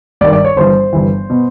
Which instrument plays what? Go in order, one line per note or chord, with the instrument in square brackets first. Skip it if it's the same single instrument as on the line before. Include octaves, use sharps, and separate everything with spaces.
[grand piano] G#1 G2 D#3 D5
D5
C#5
G1 G2 E3 C5
G1 G2 E3
B2